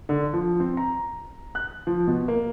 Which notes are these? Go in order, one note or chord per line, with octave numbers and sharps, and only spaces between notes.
D3
F3
C4
A#5
F#6
F3
B2
A#3